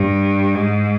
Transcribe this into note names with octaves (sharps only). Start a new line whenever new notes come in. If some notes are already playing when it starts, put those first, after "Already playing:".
Already playing: G2
G#2